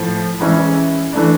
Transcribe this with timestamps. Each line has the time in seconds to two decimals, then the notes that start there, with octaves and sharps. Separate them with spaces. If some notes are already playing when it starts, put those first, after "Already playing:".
Already playing: A2 F3
0.40 E3 G#3 C#4 E4
1.13 E3 A3 D4